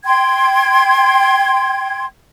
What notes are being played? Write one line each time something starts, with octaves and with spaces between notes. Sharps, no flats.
G5 C6 G#6